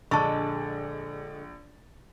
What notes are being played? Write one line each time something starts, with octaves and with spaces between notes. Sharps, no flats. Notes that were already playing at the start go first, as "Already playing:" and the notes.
A#1 D3 G#3 A5 C#6 A6